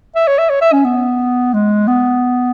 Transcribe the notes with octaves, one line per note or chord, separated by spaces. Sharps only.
E5
C#5
E5
C#5
E5
C#4
B3
G#3
B3